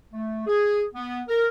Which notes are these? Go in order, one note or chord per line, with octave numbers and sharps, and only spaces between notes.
A3
G#4
B3
A#4